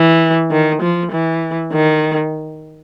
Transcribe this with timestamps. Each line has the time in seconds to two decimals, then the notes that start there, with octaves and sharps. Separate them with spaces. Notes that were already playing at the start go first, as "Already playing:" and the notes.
Already playing: E3
0.51 D#3
0.82 F3
1.12 E3
1.72 D#3